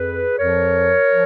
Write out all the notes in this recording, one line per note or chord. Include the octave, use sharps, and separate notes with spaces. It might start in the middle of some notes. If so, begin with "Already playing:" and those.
Already playing: F2 G#4 B4
F2 F3 A#4 C#5
F3